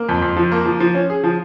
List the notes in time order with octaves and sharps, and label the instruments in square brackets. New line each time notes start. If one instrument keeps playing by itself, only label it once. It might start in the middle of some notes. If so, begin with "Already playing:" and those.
Already playing: [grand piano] A#3
F2
F2
F3
A#3
F3
F3
C#4
G#4
F3